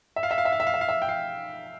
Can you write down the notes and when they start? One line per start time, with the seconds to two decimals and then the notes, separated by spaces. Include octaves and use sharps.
0.16 E5
0.23 F5
0.31 E5
0.38 F5
0.45 E5
0.52 F5
0.60 E5
0.67 F5
0.74 E5
0.81 F5
0.89 E5
1.02 G5
1.09 F5